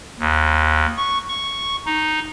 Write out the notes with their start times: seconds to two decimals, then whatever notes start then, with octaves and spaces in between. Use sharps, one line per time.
0.20 D#2
0.97 C#6
1.29 C#6
1.86 D#4